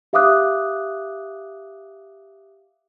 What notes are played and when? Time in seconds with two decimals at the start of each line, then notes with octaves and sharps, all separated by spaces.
0.13 G4 E5 F5 D6 D#6 F#6